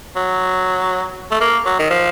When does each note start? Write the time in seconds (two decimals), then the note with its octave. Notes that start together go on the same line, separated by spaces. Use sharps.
0.16 F#3
1.31 A3
1.41 A#3
1.66 F#3
1.79 D#3
1.91 F3